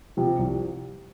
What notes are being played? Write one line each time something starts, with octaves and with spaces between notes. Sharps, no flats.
C3 F3
C2